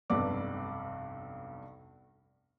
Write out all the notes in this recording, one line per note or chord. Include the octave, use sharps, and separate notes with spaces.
F1 B1 G2 B4 D5 D6